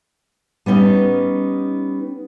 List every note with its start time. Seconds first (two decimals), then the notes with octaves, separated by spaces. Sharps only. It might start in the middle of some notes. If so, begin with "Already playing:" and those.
0.66 G3 B3 C#4 D#4